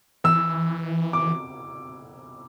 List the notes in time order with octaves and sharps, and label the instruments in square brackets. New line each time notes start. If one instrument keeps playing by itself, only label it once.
[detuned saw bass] E3 [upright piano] E6
[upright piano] D6